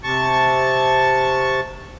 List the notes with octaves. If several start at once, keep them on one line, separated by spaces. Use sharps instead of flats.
C3 A5 C#6